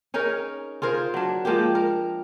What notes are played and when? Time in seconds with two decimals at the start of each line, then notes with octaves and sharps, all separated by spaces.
0.14 C#4 D#4 G#4 A#4
0.82 F4 G#4 A#4 C5
1.14 F#3 D4
1.45 F3 G#3 A#3 G4
1.75 A#4